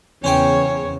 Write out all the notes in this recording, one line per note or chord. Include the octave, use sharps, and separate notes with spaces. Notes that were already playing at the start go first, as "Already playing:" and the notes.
E2 C#3 C#4 C5 C#5 G5